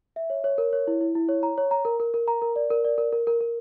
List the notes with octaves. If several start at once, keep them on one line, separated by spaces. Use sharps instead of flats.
E5
C#5
C#5
A#4
C#5
E4
E4
E4
C#5
A#5
C#5
A#5
A#4
A#4
A#4
A#5
A#4
D5
A#4
D5
A#4
A#4
A#4
A#4